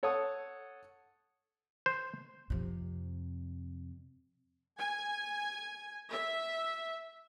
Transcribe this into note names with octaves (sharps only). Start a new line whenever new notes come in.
A4 C#5 F#5 A5 D#6
C5
F2 C3
G#5
E5